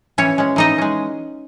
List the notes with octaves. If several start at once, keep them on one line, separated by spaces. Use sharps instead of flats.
E3 C#4 C#5
G#3 C#4
E3 D#4 D#5
G#3 C#4